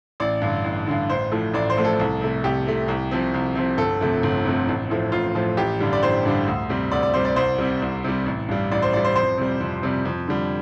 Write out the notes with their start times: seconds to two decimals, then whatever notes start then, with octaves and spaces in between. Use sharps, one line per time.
0.20 A1 D5
0.42 G2 D3
0.64 A1
0.87 G2 D3
1.09 A1 C5
1.32 A2 F3 A3
1.54 A1 D5
1.70 C5
1.77 A2 F3 A3
1.85 A4
1.99 C2
2.21 C3 A3
2.44 C2 G4
2.66 C3 A3
2.88 C2
3.11 C3 F3
3.34 C2
3.55 C3 F3
3.78 G1 A4
4.01 F2 C3 A3
4.23 G1
4.45 F2 C3 A3
4.68 A1
4.90 A2 F3 A3
5.12 A1 F4
5.35 A2 F3 A3
5.57 A1 G4
5.80 G2 D3 G3
5.93 D5
6.02 A1 C5
6.25 G2 D3 G3
6.47 D2
6.69 C3 G3
6.92 D2 D5
7.03 D5
7.14 C3 G3 C5
7.25 D5
7.36 C2 C5
7.58 C3 G3
7.82 C2
8.04 C3 G3
8.26 A1
8.49 G2 G3
8.71 A1 D5
8.82 C5
8.93 G2 D5
8.97 G3
9.04 C5
9.16 F2 C5
9.38 C3 G3
9.61 F2
9.83 C3 G3
10.05 F2
10.28 D3 G3